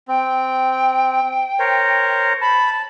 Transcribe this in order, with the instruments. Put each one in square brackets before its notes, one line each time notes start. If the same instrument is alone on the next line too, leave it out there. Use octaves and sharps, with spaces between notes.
[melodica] C4 [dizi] G5
[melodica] A#4 C5 C#5
[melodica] A5 [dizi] B5